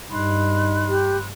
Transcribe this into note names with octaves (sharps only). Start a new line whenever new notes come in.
G2 D#4 B5 C6 F#6
G4